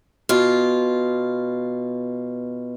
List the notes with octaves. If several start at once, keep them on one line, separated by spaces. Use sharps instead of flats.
B2 F4